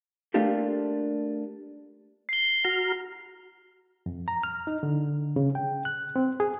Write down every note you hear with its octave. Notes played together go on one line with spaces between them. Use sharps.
A3 A#3 D4 F4 G4 A4
C7 G7
F#4 A#5 F6
F2
A#5
F6
D#4
D3
C#3
G5
F#6
C4
G#4